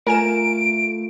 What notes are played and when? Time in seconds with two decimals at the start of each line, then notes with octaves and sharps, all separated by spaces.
0.07 A3 F4 A#4 G#5 D7 E7